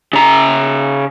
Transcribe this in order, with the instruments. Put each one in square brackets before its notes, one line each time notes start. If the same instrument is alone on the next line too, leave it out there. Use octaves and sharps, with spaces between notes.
[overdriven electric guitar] C#3 A#5